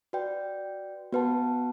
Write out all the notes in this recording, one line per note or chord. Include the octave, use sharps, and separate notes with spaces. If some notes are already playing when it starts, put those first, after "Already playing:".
F#4 B4 D5 G5
B3 F#4 B4 F#5 A5